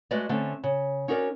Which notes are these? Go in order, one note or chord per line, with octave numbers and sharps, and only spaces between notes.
G#3 A3 F#4 B4 D5 D#5
D3 A3 C4 C#4
C#3
C#4 D#4 F#4 A#4 C5 D5